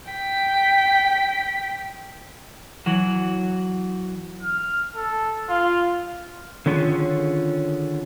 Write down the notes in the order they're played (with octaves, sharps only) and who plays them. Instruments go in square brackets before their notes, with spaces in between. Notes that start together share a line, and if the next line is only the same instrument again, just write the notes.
[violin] G5 B6
[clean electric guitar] E3 F#3 F#4
[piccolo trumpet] F6
A4
[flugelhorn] F4 [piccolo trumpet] F5
[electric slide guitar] D3 D#3 C#4 F4 G#4